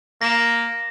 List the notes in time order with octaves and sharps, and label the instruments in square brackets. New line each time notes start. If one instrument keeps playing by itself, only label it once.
[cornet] A#3 [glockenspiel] A#6 E7